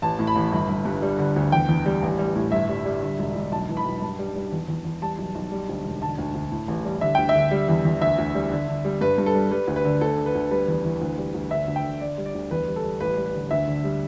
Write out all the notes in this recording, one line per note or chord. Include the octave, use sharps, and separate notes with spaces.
A1 A5
A2
B5
A1
G1
G1
G2
G3
D3
D2
E2 G5
E2
G3
A1
G3
A2
G1 E5
G3
G3
D3
E1
E1
B1 A5
E3
B5
B1
G2 A5
G3
G3
E2
E2
E2
G3 A5
B1
B1
G3
D2
E1
D3 A5
D2
D2
A2
A1
G3
D3 E5
D2 G5
E5
D3
G3
E2
E2
D2 E5
D2
G3
D3
D3
G3
G2 B4
G2
A4
G3
G3 B4
D2
B4
D3
D2 A4
D3
B4
D2
G3 B4
E2
E3
D2
G3
D2
D3 E5
D2
G5
D3
D3 D5
G3
D5
D2
E2 B4
G3
A4
G3
A1 B4
G3
B4
D3
D2 E5
D3
G3